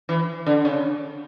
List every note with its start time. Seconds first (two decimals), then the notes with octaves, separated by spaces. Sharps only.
0.09 E3
0.46 D3
0.65 C#3